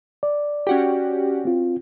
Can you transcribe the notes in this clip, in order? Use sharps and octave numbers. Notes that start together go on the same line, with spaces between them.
D5
C#4 F#4 G4
C4 F4